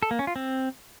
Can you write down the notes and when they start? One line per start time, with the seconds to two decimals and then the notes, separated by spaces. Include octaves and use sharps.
0.03 A4
0.11 A#3
0.19 C#4
0.27 F4
0.36 C4